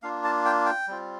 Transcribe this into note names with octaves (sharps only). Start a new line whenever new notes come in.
A#3 D4 F4 F5
A5
G5
G5
G3 C4 F4